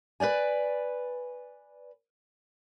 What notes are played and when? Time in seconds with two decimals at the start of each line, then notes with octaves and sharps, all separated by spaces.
0.20 B4 C#5 D5 G#5